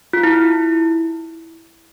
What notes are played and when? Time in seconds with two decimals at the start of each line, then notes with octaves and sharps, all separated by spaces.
0.13 F4
0.23 E4